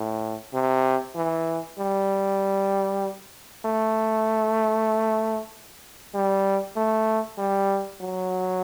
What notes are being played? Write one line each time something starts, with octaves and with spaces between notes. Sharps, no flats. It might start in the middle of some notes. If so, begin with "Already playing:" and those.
Already playing: A2
C3
E3
G3
A3
G3
A3
G3
F#3